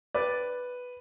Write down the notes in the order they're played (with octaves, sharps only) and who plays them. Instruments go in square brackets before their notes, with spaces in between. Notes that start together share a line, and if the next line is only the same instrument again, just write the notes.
[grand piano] B4 [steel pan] D5